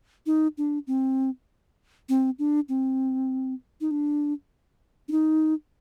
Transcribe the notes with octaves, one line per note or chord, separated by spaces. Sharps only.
D#4
D4
C4
C4
D4
C4
D#4
D4
D4
D#4